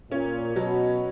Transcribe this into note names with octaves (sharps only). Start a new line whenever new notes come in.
A#2 C#4
B2 F#3